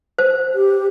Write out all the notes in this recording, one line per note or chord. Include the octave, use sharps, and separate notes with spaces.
C5
G4